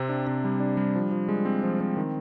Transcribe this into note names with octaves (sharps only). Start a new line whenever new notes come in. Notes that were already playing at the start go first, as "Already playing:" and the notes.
Already playing: C3 C4
D4
C3
G3
D4
G3
F3
F3
G#3
C4
F3
C4
D#3